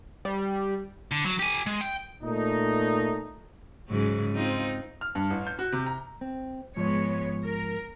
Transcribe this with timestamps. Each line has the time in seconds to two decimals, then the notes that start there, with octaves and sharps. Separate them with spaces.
0.25 G3
1.12 D3
1.26 F#3
1.39 G4 G#5
1.66 G#3
1.81 G5
2.23 A#2 A3 D#4
3.89 G#2 C#3 F#3
4.34 C4 D#4 F4
5.01 F6
5.15 G2
5.30 A1
5.47 G6
5.59 F#4
5.72 C3
5.86 A#5
6.21 C4
6.77 G#2 F3 G#3 B3 C#5
7.44 A#4